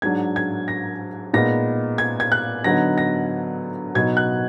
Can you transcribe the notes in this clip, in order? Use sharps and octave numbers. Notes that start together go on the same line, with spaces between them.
G#2 F#3 D4 G#6
G#6
A#6
A#2 G#3 B3 D#4 A#6
G#6
G#6
F#6
D3 F#3 B3 D#4 A#6
A#6
B2 F#3 B3 D#4 G#6
F#6